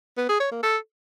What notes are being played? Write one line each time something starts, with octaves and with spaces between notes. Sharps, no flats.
B3
G#4
C#5
A#3
A4